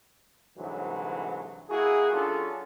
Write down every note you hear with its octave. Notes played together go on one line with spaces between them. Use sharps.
C2 G#2 D3 E3 F#3
A#3 E4 F#4 G#4
F#3 C#4 D4 F4 G#4 A4